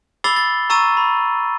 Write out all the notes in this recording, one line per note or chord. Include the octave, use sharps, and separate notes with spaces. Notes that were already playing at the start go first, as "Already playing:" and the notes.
B5 D6 E6 A6 C7 G7
A6
A#5 C#6 E6 A6 D#7
B5